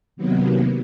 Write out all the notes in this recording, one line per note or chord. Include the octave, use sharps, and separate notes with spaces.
C3 D#3 F#3 A#3 B3